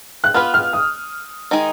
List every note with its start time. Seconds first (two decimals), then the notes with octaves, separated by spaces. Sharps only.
0.24 F#6
0.34 B3 F4 B4 F6
0.54 F6
0.73 D#6
1.51 D#3 G#3 D#4 G#4